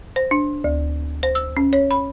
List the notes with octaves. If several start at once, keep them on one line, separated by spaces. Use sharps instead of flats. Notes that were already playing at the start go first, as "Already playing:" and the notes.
C5
D4
D2
C5
E6
C#4
C#5
B5